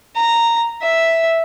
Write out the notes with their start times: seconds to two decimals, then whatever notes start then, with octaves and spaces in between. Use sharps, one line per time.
0.16 A#5
0.82 E5